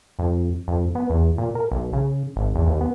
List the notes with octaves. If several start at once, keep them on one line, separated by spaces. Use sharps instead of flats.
F2
F2
B3
E2
A#2
A#4
B1
C#3
G#1
E2
D#2
B3